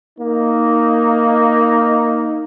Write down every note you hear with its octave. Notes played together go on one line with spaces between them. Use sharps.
A#3 D#4